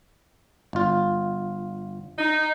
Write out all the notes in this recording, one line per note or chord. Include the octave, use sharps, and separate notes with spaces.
G1 F4
D#4